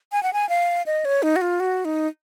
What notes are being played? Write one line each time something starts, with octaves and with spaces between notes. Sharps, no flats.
G#5
F#5
G#5
F5
D#5
C#5
D#4
F#4
F4
F#4
D#4